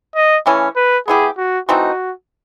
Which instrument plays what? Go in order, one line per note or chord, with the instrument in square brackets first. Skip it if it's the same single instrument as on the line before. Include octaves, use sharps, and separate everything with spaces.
[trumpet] D#5
[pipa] C#3 E3 A3 C#4
[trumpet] B4
[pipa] B3 E4 G4 [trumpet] G#4
[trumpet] F#4
[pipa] E3 A3 C4 D#4 [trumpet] F#4